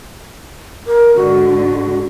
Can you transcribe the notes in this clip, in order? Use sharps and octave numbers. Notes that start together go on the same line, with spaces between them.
A#4
G#2 D3 F#4